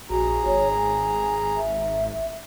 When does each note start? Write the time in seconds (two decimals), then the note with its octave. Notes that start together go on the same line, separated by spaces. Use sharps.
0.10 A#1 F#4 G#4 A#5
0.46 G#1 C#5
0.77 G#5
1.56 E5